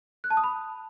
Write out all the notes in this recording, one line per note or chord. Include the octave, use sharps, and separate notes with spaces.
F#6
A5
D#6
B5